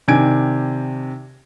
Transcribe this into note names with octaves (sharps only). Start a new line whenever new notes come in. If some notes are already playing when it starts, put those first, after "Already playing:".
C3 D#3 D4 G#5 G#6 D7